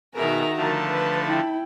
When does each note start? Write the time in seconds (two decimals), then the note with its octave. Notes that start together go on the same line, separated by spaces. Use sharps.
0.15 B2 D#3 F#4 G#4 A#4 E5 A#5
0.57 D3 F3 A3 A#4 E5 A5
0.89 B4 B5
1.27 E4 G5